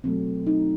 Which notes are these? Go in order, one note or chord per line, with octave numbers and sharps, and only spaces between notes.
B2 F#3 A3 C4
D#4